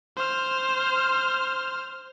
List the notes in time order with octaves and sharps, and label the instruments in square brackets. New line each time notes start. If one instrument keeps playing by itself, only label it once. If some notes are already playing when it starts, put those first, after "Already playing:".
[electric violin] C5 F6